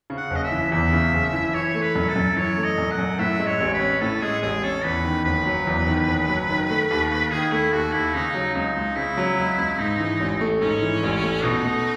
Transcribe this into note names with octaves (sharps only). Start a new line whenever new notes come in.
C#3
F#5
F#1
D#5
E5
E3
E2 E5
C#3
F#1
E3
E3 C#5
A3
B4
F#2
A4
F#2
E3 C#5
A3
D#5
F#2
F#5
F#2
A2 E5
G#3
C#5
A1
B4
C#4
A2 A4
G#3 G#4
A1 G#4
C#4 A4
E2 B4
D#3
F#1 B4
F#3
E2
D#3
F#1
F#3
D#3
A3
D#2
D#2
D#3 G#4
A3 E4
D#2 F#4
D#2 E4
C#3 D#4
F#3
C#2 D#4
C#2
C#3 E4
F#3
C#2
C#2
G#2 D#4
E3
A1
A3
G#2 C#4
E3
A1
A3
B2 D#4
A3